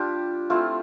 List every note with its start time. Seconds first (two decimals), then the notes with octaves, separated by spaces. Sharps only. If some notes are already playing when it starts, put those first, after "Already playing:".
Already playing: G3 D4 F4 G4
0.50 A3 C4 E4 F4